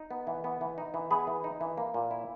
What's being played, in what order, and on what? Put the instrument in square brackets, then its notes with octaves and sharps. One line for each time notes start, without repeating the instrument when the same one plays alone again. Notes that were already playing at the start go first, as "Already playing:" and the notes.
Already playing: [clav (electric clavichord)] D#4
B3
E3
B3
E3
D#4
E3
B3 G#4 B4
E3
D#4
E3
A#3
A#2
E4